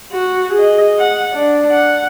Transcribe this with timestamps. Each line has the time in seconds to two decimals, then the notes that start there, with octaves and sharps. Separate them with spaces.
0.12 F#4
0.54 G#4 D#5
0.99 F#5
1.34 D4
1.72 F#5